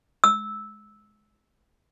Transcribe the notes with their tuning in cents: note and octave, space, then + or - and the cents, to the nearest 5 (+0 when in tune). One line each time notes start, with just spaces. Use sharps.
E6 -10